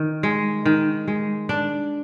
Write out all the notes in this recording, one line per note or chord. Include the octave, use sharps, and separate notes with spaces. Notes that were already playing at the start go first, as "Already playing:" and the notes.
Already playing: D#3
G#3
D#3
G#3
D4